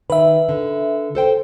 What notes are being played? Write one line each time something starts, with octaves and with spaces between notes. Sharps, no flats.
D#3 B4 E5
D3
A4 C5 G5